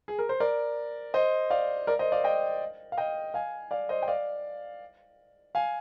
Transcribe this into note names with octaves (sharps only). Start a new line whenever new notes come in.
G#4
A#4
C5
A#4 D5
C5 D#5
D5 F5
A#4 D5
C5 D#5
D5 F5
D#5 G5
F5
D#5 G5
F5 G#5
D5 F5
C5 D#5
G5
D5 F5
F5 G#5